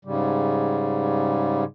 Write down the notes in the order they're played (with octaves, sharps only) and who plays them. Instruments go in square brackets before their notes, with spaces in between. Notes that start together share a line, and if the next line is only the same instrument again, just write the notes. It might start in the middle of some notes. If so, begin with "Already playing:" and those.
[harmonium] G#2 C#3 G3